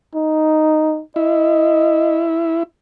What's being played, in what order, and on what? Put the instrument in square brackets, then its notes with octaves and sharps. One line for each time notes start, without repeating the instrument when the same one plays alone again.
[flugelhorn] D#4
[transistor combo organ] E4 [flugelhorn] D#5